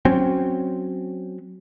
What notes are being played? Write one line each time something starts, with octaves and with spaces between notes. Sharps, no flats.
F#3 C4 C#4